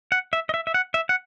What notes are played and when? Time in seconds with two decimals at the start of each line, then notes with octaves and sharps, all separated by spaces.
0.12 F#5
0.33 E5
0.49 D#5
0.54 E5
0.67 E5
0.74 F#5
0.94 E5
1.09 F#5